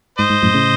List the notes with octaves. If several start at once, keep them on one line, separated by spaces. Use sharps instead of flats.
G#2 C5 D#5
G#2
F#2 A2
A2 C#3